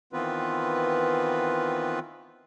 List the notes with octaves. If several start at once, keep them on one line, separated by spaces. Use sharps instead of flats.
D#3 E3 B3 C4 F4 B4